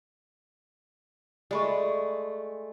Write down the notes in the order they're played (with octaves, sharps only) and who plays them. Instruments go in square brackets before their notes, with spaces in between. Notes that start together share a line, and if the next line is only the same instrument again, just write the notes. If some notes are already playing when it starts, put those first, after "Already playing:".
[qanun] G#3 A3 [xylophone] D5 B5 C#6